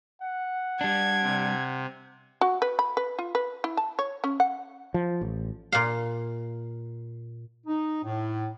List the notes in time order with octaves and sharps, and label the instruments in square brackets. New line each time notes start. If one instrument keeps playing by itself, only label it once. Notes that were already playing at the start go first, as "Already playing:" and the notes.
[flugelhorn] F#5
[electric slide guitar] G3 D4 [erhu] G#6
[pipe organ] C3
[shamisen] F#4
B4
B5
B4
F4
B4
E4
A5
C#5
C#4
F#5
[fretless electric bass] F3
A1
[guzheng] A#2 F5
[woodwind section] D#4
A2